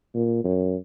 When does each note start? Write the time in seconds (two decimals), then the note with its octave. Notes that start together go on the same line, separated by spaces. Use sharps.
0.15 A#2
0.44 F#2